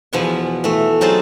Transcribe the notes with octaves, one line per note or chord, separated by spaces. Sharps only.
E2 B2 F3 B3 F#5 G#5
E3 A3
F#3 C4 D#4 F4 G#4 A5